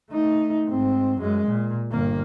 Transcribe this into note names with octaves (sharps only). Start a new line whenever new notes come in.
A3 D#4
G#2 C4
F#2 G#3
A#2
G1 A#3